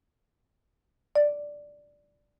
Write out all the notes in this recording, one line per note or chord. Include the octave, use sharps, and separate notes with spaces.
D5